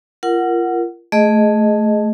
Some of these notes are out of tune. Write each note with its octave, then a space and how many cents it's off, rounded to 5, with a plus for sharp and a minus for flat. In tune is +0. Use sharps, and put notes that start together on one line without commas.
F4 -30 A#4 +0 F#5 +0
A3 -10 G#4 +0 D#5 +0